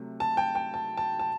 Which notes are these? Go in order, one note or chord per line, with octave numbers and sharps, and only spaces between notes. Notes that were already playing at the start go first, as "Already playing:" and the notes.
Already playing: C3 F#3 A3
A5
G5
G5
A5
A5
A5